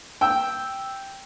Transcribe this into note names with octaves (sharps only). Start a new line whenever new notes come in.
G5 E6